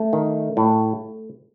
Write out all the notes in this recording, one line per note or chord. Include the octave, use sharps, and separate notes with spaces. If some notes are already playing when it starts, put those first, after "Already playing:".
Already playing: A3
D#3
A2